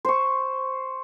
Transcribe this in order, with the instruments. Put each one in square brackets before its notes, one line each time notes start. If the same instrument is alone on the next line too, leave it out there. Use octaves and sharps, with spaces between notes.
[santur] C5 C#6